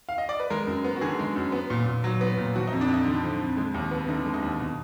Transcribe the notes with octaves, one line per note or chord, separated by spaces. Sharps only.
F5
D#5
D5
B4
G#3 A#4
F#2
B3
F#4
D3 G#4
G#3
F#2
B3
A#2
A#2
F#3
B3
A#2
F3 F#4
D#4
F2
D4
F2 D#4
D3
F3
F2
G#3
D#2
B3
D3 D#4
G#3
D#4
D#2
B2